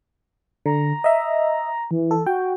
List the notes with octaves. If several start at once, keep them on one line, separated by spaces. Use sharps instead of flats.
D3 A#5
D#5 E5
E3
A4
F#4 G5